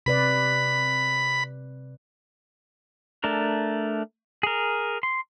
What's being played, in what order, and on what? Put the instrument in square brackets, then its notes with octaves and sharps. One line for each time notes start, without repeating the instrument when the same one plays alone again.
[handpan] C3 B4 D5 [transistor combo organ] B5
[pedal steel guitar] A3 D4 A#4
G#4 A#4
C6